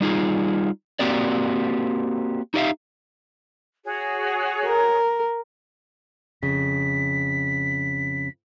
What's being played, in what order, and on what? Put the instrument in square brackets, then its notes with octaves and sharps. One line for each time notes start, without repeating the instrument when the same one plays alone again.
[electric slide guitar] G3 D#4 F4 G#4
A#3 C4 F#4 G4 A#4 D5
D#4 G4 D5 E5 F5
[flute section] F#4 G#4 C#5
[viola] A#4
[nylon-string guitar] F2 C#3 [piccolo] B6